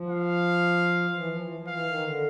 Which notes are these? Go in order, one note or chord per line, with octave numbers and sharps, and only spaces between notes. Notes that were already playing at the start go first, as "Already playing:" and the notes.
Already playing: F3
F5
F3
E3
F3
E3
F3
E3 F5
D#3
D3